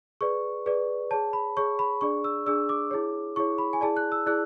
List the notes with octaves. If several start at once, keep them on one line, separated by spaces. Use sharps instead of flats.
G#4 B4 D5 C#6
G#4 B4 D5
G#4 C#5 A5
B5
G#4 C#5 C#6
B5
D4 G#4 D5 C#6
E6
D4 G#4 D5 E6
D6
E4 G#4 C#5
E4 G#4 C#5 C#6
B5
G#5
E4 G#4 D5 A5
F#6
E6
E4 G#4 D5 F#6